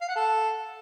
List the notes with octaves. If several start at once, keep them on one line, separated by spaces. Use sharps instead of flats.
F5
F#5
A4